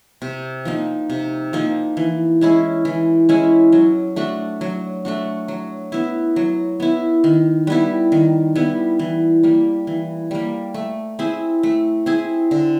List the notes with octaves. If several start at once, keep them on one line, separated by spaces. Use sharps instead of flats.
C3
F3 A#3 D#4
C3
F3 A#3 D#4
E3
G#3 C#4 E4
E3
G#3 C#4 E4
F#3
A3 D4 F#4
F#3
A3 D4 F#4
F#3
B3 E4
F#3
B3 E4
D#3
G3 B3 E4
D#3
G3 B3 E4
E3
G3 A#3
E3
G3 A#3
A3
C4 E4 G#4
A3
C4 E4 G#4
D3